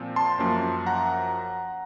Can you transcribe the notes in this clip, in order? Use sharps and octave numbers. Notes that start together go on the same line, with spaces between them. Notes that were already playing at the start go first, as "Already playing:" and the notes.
Already playing: A#2 F3 C4
A5 C6
F#2 F3 A#3 C#4
F#5 A#5